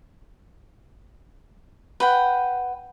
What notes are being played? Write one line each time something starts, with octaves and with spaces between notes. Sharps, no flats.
B4 F#5 G5